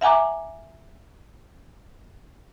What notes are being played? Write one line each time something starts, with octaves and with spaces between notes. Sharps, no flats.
E5 F#5 G#5 A#5 D6